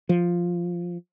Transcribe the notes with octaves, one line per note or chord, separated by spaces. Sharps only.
F3